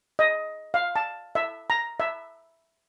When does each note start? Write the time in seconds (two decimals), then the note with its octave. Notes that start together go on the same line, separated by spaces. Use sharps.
0.19 D#5
0.74 F5
0.96 A5
1.35 E5
1.70 A#5
2.00 E5